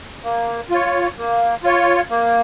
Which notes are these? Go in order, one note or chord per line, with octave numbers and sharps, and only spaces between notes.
A#3
F4 C#5
A#3
F4 C#5
A#3